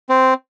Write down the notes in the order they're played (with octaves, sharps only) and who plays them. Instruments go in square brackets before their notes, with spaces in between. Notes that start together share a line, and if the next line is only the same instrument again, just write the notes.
[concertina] C4